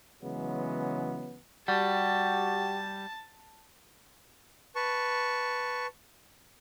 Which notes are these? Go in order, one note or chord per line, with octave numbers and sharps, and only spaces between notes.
C#3 E3 F#3 G#3 B3
G3 F#4 G4 A5
B4 A5 C#6